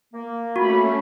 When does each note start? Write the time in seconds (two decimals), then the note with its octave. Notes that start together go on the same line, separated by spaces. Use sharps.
0.14 A#3
0.56 A3 C#4 F#4 B5